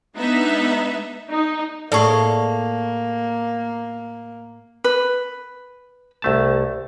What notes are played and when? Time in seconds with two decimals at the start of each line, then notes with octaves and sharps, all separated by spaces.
0.17 G#3 B3 D4 D#4 E5
1.30 D#4
1.92 A2 A#3 G#4 D5 A5 C6 C#6
4.84 B4
6.22 C2 A3 A5